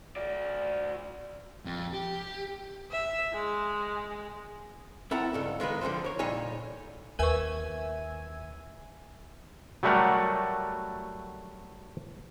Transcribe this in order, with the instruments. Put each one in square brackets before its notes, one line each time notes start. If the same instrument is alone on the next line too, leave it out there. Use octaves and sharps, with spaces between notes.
[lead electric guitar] F#4 D5
F2
G4
[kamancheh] E5
G#3
[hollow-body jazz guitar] C4 E4 A4 A#4 F#5 A#5
C#2 G2 A4
D#3 G#3 A#3 B4
D3 F3 F#3 A3 C5
A#4 C#5
A#2 G3 D#4 A4 C#5 G#5
[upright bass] D#2 [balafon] A#4 B4 C#6 [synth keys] E5 G#5 D#7
[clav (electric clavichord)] F#3 G3 A3 F#4 A#4 F#5